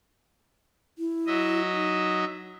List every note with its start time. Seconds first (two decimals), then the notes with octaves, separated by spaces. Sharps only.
0.98 E4
1.26 F#3 D#5 E5
1.71 D#4